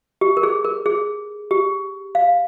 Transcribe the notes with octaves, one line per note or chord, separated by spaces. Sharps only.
G4
A#4
G#4
A#4
G#4
G4
F5